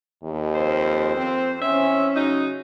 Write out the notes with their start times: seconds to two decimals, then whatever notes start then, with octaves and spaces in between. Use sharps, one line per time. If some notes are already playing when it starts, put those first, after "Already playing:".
0.23 D#2
0.55 F2 C5
1.17 C4
1.62 E2 C4 C#4 E5
2.15 C#3 F#3 D#4